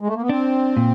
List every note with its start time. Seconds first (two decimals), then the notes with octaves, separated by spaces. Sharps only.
0.01 G#3
0.07 A3
0.15 A#3
0.22 B3
0.29 C4 D4
0.77 A#2